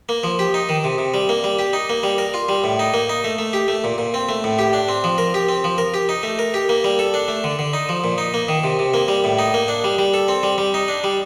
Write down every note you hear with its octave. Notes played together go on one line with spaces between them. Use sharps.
A#3
F3
G4
D#4
D#3
C3
C3
G3
A#3
G3
G4
D#4
A#3
G3
A#4
F4
G3
A2
D#4
A#3
D#4
A3
A3
G4
A3
A#2
A#2
C4
A3
A2
G4
D4
C4
F3
A#4
G4
C4
F3
A#4
G4
D#4
A3
A#4
G4
A#3
G3
A4
D4
A3
D3
D3
D#4
F3
A#2
D#4
A#3
D#3
C3
C3
A#3
G3
A2
D#4
A#3
D4
G3
G3
A4
C4
G3
G3
D#4
D4
G3